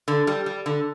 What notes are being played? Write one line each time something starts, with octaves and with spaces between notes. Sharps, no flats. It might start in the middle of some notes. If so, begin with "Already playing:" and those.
D3
G3
G3
D3